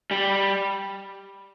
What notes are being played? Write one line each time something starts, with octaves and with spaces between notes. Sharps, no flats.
G3